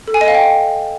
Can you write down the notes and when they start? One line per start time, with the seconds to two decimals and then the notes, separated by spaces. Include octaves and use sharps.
0.08 A4
0.14 G#5
0.21 D#5
0.28 F5
0.35 G5